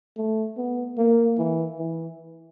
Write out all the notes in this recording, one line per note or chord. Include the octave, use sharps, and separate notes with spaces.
A3
B3
A#3
E3
E3